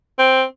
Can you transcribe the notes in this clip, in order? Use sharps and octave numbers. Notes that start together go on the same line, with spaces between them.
C4